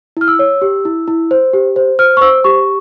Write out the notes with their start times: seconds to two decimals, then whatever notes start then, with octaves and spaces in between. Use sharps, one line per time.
0.17 E4 F6
0.28 E6
0.39 C#5
0.62 G4
0.85 E4
1.08 E4
1.31 C5
1.54 G4
1.76 C5
1.99 C5 F6
2.17 C#6
2.21 C5 E6
2.44 G4 C#6